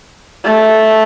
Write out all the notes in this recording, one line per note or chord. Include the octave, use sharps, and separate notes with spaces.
A3